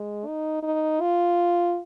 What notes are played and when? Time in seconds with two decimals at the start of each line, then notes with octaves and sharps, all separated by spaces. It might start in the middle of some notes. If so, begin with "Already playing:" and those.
Already playing: G#3
0.26 D#4
0.63 D#4
1.01 F4